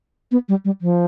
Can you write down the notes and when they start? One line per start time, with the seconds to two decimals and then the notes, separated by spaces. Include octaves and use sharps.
0.32 B3
0.49 G3
0.65 G3
0.81 F3